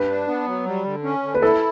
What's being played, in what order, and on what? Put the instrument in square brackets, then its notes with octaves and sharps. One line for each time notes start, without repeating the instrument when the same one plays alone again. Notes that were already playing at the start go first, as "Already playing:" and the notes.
Already playing: [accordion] G2 [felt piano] B4
[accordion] D4
B3
F#3
G3
D3
C#4
D3
[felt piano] B4
[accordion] E4 [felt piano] A4